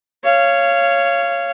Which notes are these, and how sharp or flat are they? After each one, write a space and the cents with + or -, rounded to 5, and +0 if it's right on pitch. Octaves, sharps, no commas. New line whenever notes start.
C#5 +0 F5 -20